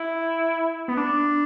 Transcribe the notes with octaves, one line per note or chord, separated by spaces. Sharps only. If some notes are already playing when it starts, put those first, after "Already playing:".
Already playing: E4
B3
D4